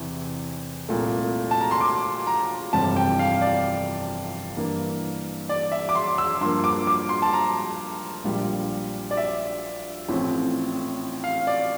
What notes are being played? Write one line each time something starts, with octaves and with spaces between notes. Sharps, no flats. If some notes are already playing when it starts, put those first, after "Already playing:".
Already playing: E2 C3 E3
C2 A#2 A3
A5
A#5
C6
D6
A#5
G1 F2 C3 E3 G3 A5
G5
F5
D5
G2 E3 A#3
D5
E5
D6
C6
E6
G2 F3 A#3 C6
D6
D6
C6
A5
A#5
A#1 A#2 G3
D5
E5
A1 A2 F3 C4
F5
D5